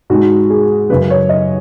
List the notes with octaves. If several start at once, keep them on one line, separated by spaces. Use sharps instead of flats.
G#2 G#3 F#4
G#4
F#2 C#3 F#3 B4
C#5
D#5